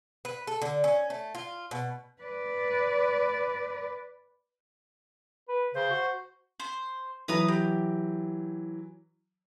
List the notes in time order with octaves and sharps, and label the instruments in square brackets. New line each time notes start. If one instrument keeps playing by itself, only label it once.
[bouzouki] B4
A4
D3
C#4
A3
F4
B2
[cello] B4 D5
[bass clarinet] B4
[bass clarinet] C#3 [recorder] C5
[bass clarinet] F#4
[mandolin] C5
[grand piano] E3 F#3 [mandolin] B4 A#5 D#6
[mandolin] G4